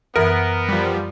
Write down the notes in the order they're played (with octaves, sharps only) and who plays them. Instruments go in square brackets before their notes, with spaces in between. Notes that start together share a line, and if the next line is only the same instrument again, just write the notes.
[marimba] F#2 E3 E5 [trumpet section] B3 [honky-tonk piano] A#4
[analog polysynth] F3 G3